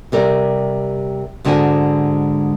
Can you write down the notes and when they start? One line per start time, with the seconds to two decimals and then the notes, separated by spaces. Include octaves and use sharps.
0.12 C3 G3 A#4
1.45 G#2 D3 G#3 F#4 G#5